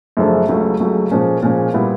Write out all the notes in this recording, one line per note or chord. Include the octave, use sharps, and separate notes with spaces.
F#2 C#3 F3 A3 D4
C#2 C#3 F#3 A3
C#2 C#3 F#3 A3
A#2 F3 G#3 C#4
A#2 F3 G#3 C#4
A#2 G3 B3 E4